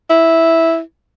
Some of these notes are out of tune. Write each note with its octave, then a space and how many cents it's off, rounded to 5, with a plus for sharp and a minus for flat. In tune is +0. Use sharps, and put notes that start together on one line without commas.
E4 -5